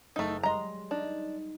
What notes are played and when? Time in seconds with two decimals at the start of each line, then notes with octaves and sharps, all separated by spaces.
0.16 F#1 A3 D#4 E6
0.43 G3 G#3 D#5 A#5 C6
0.91 D4 D#4